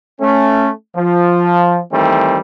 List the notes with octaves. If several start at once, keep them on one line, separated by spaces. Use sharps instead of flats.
A3 C#4
F3
D#3 E3 G3 A3 C4